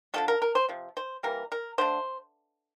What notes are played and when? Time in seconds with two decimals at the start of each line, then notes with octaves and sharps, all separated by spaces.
0.14 D3 F3 A3 A4
0.28 A#4
0.42 A#4
0.55 C5
0.69 C3 F3
0.97 C5
1.23 E3 G3 A#3 A#4
1.52 A#4
1.78 D3 A3 C5